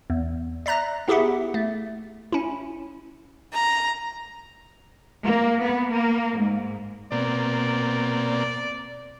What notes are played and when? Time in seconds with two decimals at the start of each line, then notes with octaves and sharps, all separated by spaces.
0.10 E2
0.66 D5 E5 A#5 F#6 A#6
1.08 B3 E4 G4 G#4 E5 F#5
1.54 A3
2.32 C#4 E4
3.53 A#5
5.24 A#3
5.61 B3
5.92 A#3
6.38 G#2
7.12 B2 A#3 C4 D5